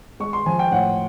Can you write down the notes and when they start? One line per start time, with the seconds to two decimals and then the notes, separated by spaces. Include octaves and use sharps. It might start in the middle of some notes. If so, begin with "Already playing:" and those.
0.20 G#3 C#6
0.33 C6
0.46 F3 G#5
0.59 G5
0.72 A2 F#5